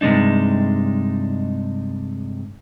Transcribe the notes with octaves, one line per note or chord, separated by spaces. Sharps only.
G2 C3 G#3 D4 D#4